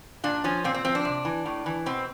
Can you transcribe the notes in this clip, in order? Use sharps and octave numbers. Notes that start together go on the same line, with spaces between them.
A#2 D4
F3 C#4
A#2 C4
C4
F3 C4
D4
C3
E3
A2
E3
B2 C4